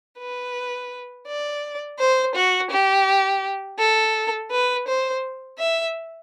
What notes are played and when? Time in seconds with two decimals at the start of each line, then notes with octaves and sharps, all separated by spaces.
0.19 B4
1.27 D5
1.99 C5
2.35 F#4
2.70 G4
3.79 A4
4.51 B4
4.87 C5
5.59 E5